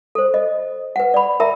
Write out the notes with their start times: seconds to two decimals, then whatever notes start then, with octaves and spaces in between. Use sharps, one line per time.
0.15 A4 C5
0.34 D#5
0.96 B4 F#5
1.14 D5 B5
1.40 A#4 E5 A#5